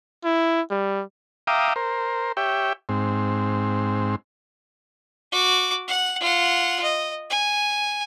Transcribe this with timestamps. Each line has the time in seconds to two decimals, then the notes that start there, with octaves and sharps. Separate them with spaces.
0.24 E4
0.70 G3
1.47 E5 F5 G5 A#5 D6 D#6
1.76 A#4 C5
2.37 G4 C#5 E5 G5
2.89 G#2 C4
5.32 F#4 D6
5.88 F#5
6.20 F4 F#5
6.84 D#5
7.30 G#5